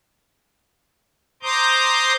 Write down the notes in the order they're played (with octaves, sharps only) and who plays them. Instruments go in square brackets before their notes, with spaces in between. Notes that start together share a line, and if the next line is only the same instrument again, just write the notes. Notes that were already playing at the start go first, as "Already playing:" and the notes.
[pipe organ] C5 A#5 C6 D6 D#6 G6